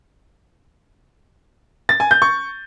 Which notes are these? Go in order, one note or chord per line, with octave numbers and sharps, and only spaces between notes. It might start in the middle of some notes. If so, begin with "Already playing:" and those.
A6
G#5
G6
C#6